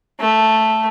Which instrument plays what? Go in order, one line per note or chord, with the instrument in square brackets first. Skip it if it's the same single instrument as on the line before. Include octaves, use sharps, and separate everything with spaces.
[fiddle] A3